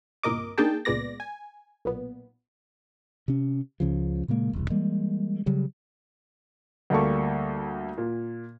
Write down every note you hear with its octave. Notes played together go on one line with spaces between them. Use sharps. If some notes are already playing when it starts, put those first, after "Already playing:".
G1 C2 A#2 A#4 D#5 D6
A#3 D4 D#4 G#4 G5 A5
C#2 A#2 G#3 B3 D5 A#6
G#5
B1 A#2 B3
C3 C#4
C#2 C#3 F3
A#2 C#3 G#3 A#3
E1 C2
E3 G3 G#3 A#3
C#3 F#3 G3
D2 G3 A#3 A4 C#6
A#2